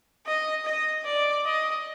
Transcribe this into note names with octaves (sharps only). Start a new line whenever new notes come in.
D#5
D#5
D5
D#5